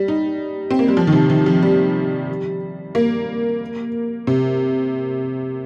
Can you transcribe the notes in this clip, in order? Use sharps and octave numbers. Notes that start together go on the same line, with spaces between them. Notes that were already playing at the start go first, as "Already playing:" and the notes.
Already playing: G3
D#4
C4
A#3
G3
F3
D#3
C3
D#3
F3
G3
A#3
C3